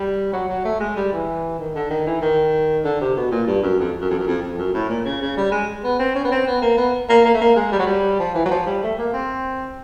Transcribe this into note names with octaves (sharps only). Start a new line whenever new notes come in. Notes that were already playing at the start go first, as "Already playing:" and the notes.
Already playing: G3
F#3
F#3
A3
G#3
G3
E3
D#3
D3
D#3
E3
D#3
D3
C3
B2
A#2
G2
F#2
F2
F#2
F2
F#2
F2
F2
F#2
A2
A#2
C#3
C#3
G3
G#3
B3
C4
C#4
B3
C4
B3
A#3
B3
A#3
A#3
A3
A#3
G#3
G3
F#3
G3
F3
E3
F#3
F3
G3
A3
A#3
C4